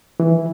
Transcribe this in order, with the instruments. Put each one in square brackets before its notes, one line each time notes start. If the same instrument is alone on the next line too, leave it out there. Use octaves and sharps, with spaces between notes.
[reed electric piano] E3